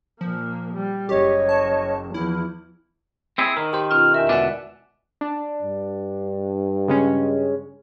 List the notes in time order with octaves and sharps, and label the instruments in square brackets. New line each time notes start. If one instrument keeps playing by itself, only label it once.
[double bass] A#2 A#3 [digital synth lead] F3
[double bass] G3
[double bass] F#1 [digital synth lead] G4 [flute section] C#5 D#5 C#6
[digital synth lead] A5
[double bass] E2 F3 [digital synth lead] E4
[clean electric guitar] C4 E4 G#4
[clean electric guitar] D#3 [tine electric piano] A#4
[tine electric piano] G4 C5
[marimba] B2 C#4 F4 [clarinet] F6
[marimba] E2 A#4 [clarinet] E5
[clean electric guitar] B2 [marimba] D3 G#3 [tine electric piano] D5 F#5
[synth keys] D4
[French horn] G2
[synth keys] C#3 G#3 C#4